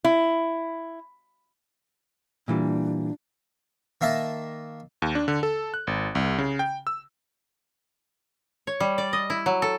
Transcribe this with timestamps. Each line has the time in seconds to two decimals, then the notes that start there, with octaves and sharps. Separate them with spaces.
0.04 E4
2.48 A#2 E3 G3 D4
4.01 D#3 A#3 E5 A5
5.02 D#2
5.15 D4
5.28 D3
5.43 A4
5.74 F#6
5.87 G#1
6.15 C2
6.38 C#3
6.59 G5
6.87 E6
8.67 C#5
8.80 G3
8.98 D5
9.13 D#5
9.30 E4
9.46 F#3
9.62 A4